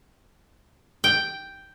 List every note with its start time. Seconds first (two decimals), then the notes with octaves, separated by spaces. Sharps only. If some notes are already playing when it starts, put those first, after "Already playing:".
1.04 G5